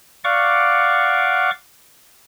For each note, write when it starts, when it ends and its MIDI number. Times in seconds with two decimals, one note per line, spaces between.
0.24 1.50 74
0.24 1.50 77
0.24 1.50 78
0.24 1.50 85
0.24 1.50 86